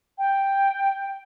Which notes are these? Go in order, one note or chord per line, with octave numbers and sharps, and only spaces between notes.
G5